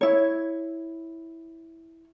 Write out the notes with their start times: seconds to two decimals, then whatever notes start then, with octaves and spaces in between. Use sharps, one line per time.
0.01 E4 C#5